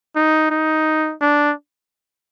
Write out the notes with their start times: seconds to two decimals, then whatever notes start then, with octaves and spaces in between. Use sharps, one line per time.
0.16 D#4
0.51 D#4
1.21 D4